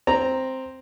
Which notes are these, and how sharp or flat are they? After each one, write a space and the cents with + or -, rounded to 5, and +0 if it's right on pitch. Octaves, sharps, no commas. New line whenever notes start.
C4 +0 A#5 -5